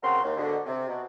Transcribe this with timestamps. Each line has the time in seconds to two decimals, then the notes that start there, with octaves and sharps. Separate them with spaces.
0.03 C#3 F#3 C4 F#4 A#4 C6
0.24 D#2
0.37 G#2 B2 D3
0.66 C3
0.89 B2